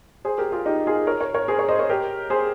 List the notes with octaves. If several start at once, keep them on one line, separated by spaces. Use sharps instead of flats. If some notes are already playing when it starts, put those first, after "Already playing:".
G#4 C5
G4 A#4
F4 G#4
D#4 G4
F4 G#4
A#4 C#5
A#4 C#5
A#4 C#5
G#4 C5
A#4 C#5
C5 D#5
A#4 C#5
G4 A#4
G#4 C5